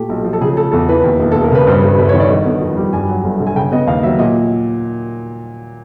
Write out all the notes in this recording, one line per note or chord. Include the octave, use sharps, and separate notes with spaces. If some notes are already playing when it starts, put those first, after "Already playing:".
Already playing: A#2 A3 G4
B1
F3
A4
C#3 G#4
A3 A4
E2 A4
E3 B4
D#2
E1
E1 A4
A#4
C#3 B4
G2 C5
G1 B4
G1 B4
C#5
D#3
D5
D3 D#5
B3
F2
G3
G2 G#5
F#3
G1
D3
G#5
C#3 G5
B3 D#5
D#2 F5
F#3 E5
A#2 D#5